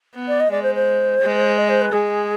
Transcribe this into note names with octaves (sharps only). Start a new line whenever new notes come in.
B3
D5
D#5
G#3 D5
C5
C5
G#3
D#5
C5
B4
G#3 G#4